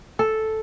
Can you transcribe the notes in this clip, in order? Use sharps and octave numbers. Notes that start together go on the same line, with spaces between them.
A4